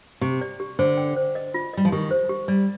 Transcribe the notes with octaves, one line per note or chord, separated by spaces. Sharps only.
C3 G4
D5
G4
D3 C5
G5
C5
D#5
F4
G3 D#5
F3
D#3 G4
C5
G4
G3 D5